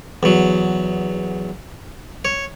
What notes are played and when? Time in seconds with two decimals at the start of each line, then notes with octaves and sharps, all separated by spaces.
0.23 E2 F#3
2.25 C#5